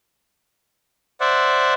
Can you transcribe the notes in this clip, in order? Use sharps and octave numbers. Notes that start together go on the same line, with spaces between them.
C5 D5 E5 F#5